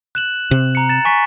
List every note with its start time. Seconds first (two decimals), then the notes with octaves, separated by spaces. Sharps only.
0.15 F#6 E7 F#7
0.51 C3
0.75 A#5 C#7
0.89 A6 E7
1.05 G#5 C#6 B6